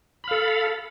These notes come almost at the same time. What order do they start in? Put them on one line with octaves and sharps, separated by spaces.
B5 F5 A4